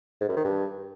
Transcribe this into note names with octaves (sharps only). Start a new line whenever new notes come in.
G#2
F#2
D#3
G2